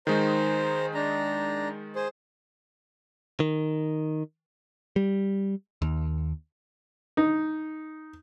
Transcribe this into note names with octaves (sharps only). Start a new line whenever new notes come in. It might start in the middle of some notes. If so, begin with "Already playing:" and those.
D#3 G#3 D#4 C5 A#5
D4 A#5
G#4 C5
D#3
G3
D#2
D#4